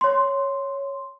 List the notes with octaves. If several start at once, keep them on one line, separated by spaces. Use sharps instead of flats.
C#5 C6